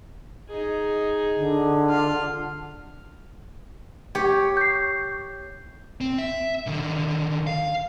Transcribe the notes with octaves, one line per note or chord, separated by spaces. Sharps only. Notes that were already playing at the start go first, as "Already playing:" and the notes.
D#4 G#4
D3
F4 F5
G4 C#5
G6 C7
C4
E5
D3 D#3
F5